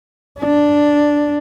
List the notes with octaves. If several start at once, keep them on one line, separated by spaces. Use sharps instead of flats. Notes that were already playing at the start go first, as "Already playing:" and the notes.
D4